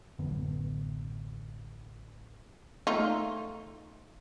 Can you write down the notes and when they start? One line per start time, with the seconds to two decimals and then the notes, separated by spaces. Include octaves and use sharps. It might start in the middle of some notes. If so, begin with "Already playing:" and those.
0.19 A1 F#2 D3 B3
2.87 A3 D#4 F4